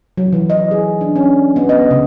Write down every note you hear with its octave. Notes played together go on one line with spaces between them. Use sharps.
F#3
E3
D#5
G#4
D4
C#4
B3
D#5
C#3